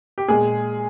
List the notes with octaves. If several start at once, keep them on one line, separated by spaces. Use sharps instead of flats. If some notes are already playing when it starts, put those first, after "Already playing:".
G4
A#2 G#3 G#4